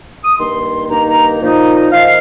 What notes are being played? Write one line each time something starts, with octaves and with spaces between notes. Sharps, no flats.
D#6
G2 D#3 A#3 D#4 C6
G2 D#3 A#3 D#4 A#5
A#5
A#2 F3 D#4
A#2 F3 D#4 F5